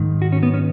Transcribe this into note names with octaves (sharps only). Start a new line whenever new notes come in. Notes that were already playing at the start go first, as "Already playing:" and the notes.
Already playing: G#2 D#3
F#4
C#4
B3
C#4